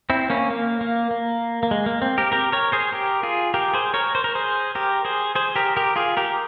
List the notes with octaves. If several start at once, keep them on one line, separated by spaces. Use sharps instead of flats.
C4 E4
A#3 C#4
A#3
A#3
A#3
A#3
G#3
A#3
C4
G4 A#4
G4 A#4
A#4 C#5
G#4 C5
G4 A#4
F4 G#4
G4 A#4
G#4 C5
A#4 C#5
C5
A#4
G#4 C5
G4 A#4
G#4 C5
G#4 C5
G4 A#4
G4 A#4
F4 G#4
G4 A#4